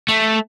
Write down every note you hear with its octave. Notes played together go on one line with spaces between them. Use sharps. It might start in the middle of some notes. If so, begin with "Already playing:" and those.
A3